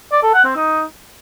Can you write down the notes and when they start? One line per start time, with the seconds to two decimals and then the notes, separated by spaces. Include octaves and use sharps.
0.12 D5
0.23 A4
0.34 F#5
0.45 C4
0.56 D#4